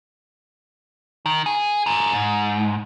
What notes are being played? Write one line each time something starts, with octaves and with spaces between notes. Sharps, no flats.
D#3
G#4
G#4 A#4
G#2